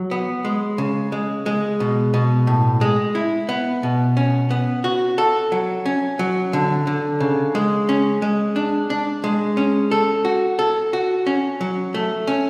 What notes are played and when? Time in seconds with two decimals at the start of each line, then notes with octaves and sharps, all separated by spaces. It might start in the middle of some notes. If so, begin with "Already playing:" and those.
Already playing: F#3
0.11 B3
0.45 G#3
0.78 C#3
1.12 G#3
1.46 G#3
1.80 B2
2.14 B2
2.47 A2
2.81 G#3
3.15 E4
3.49 B3
3.83 B2
4.17 C#4
4.51 B3
4.84 F#4
5.18 A4
5.52 F#3
5.86 C#4
6.19 F#3
6.53 D3
6.87 D3
7.20 C#3
7.55 G#3
7.89 C#4
8.22 G#3
8.56 D4
8.90 D4
9.24 G#3
9.57 C#4
9.91 A4
10.25 F#4
10.59 A4
10.93 F#4
11.27 C#4
11.61 F#3
11.94 A3
12.27 C#4